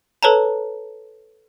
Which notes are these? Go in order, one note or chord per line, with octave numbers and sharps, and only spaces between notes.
A4 B4 C#5 A5 A#5